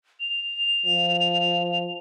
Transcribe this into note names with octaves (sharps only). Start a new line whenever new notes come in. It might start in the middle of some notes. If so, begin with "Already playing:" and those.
F7
F3